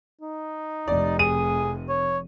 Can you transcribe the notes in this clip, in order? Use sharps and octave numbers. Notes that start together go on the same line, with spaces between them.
D#4
F1 C3 D5
G#4 D#7
C#5